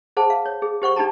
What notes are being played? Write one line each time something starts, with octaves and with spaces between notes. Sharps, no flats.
G#4 C5 F#5 A5
F5
C#5
G#4
G4 C5 F#5 C#6
D4 D#4 G4 A5 A#5